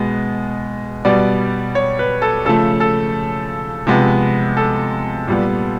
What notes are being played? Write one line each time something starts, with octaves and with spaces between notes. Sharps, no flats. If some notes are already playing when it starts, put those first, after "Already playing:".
Already playing: B2 G#3 B3
B2 G3 B3 D5
C#5
B4
A4
C#3 F3 A3 A4
A4
C3 F3 G#3 B3
A4
A#2 G3 B3